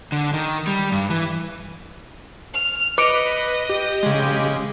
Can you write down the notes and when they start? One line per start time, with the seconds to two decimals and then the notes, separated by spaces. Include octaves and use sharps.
0.12 D3
0.33 D#3
0.67 G3
0.92 G2
1.10 E3
2.54 F6
2.98 B4 D#5 D6 C#7 D7
3.69 G4
4.03 C#3 G#3